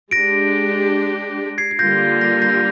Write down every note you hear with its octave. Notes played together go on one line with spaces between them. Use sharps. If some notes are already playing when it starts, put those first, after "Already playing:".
G#3 D4 G4 A#6 D7
G#6 C7
C7
D3 G3 A#3 F4 G6 A#6
G6 A#6
G6 A#6
A#6